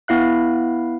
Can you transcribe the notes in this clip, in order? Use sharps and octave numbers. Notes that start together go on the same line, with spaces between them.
B3 E4 F5 F#6